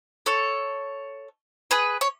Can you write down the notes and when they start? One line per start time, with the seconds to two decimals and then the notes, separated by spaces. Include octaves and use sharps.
0.26 A4 C#5
1.71 G#4 B4
2.01 C#5